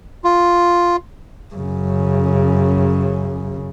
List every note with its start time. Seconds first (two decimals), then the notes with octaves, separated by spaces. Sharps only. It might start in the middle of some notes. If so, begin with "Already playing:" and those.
0.24 F4
1.54 F#2 C#3